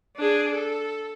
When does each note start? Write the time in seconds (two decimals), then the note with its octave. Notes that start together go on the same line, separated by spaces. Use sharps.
0.16 D4 G#4
0.52 A4